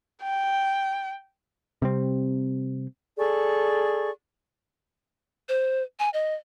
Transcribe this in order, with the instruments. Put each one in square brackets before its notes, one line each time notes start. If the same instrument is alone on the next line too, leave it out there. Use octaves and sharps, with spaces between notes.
[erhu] G5
[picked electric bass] C3 G3 C4
[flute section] G#4 A4 D5 C#6
[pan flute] C5
G#5
D#5